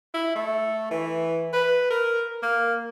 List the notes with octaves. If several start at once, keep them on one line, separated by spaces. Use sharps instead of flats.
E4
A3
E3
B4
A#4
A#3